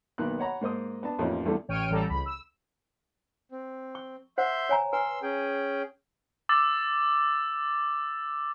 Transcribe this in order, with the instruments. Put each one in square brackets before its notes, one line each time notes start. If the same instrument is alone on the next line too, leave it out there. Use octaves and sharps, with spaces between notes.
[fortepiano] B1 D#3 A#3 B3 F#6
C#5 F#5 A#5 B5
G#2 A#3 C5 D#6
B3 D4 A5
A1 F2 A#3 C#4 D#4 F4
E2 G2 D3 E3 A3
[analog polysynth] A1 C#5 G5 F6 D7 D#7
A1 G3 A4 A#5
C#2 B5
E6
[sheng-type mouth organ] C4
[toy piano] C#6
[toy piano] C5 F#5 [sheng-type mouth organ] E5 C6 G6
[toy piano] C#5 G#5 A#5
[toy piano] B4 G#5 [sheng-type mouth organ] C6 E6
[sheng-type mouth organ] C#4 G#4 G5
[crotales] D6 E6 A6